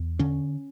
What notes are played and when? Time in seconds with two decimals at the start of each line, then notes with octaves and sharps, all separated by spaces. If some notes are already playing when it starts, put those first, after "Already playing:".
Already playing: E2
0.19 D3 C#4